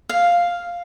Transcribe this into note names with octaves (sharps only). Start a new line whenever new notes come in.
F5